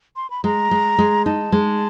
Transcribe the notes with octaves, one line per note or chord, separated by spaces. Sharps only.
C6
B5
G#3 A#5
G#3
G#3
D#4 A5
G#3